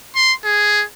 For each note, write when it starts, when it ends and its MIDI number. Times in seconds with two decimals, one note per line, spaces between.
0.16 0.33 84
0.44 0.84 68